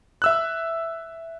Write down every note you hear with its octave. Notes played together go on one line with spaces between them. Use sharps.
E5 E6 F#6